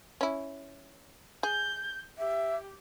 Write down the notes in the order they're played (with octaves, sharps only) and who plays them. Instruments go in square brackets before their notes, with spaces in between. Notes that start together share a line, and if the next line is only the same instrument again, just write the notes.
[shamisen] C#4 E4
[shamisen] G#4 [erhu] G6
[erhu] G4 [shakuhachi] E5